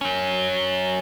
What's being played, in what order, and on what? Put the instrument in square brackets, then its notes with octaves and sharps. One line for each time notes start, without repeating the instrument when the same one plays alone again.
[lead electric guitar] F#3 C#4